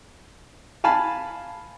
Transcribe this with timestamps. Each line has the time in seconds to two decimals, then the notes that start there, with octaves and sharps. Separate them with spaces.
0.84 F5 G#5 A5 B5